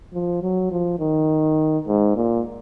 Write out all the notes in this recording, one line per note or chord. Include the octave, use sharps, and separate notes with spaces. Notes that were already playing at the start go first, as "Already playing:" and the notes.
F3
F#3
F3
D#3
G#2
A#2